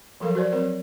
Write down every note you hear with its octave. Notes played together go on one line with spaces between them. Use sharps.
F3 F#3 A4 A#4 F5
F#4 C5 D5
F#3 C4 A#4 C5